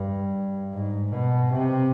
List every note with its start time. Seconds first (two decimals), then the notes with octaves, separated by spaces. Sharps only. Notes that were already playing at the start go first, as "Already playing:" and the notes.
Already playing: G2
0.73 G#2
1.12 B2
1.52 C3